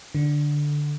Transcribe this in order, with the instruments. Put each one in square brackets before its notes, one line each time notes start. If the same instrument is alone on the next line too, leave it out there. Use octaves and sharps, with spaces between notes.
[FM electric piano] D3